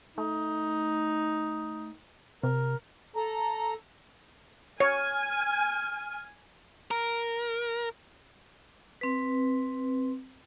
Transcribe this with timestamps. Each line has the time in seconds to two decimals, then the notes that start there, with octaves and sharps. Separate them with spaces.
0.18 A3 D#4
2.43 C3 A#4
3.16 A4 A#5
4.80 C#5 G#5 F6
6.91 A#4
9.01 C4 B4